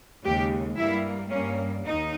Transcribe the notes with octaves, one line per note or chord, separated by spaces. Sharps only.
D#2 C#3 G#3 G4
G2 G3 A#3 E4
G2 G3 A#3 C#4
D#2 D#3 D#4